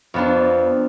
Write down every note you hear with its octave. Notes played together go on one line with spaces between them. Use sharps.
F2 B3 D4